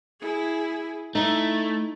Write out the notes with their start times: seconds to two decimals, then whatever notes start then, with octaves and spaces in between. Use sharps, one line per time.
0.21 E4 G#4
1.15 A3 D#4 E4